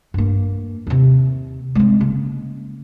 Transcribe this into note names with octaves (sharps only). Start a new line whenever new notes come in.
G2 A#3
D#2 C3
G#3 C4
C#3 A#3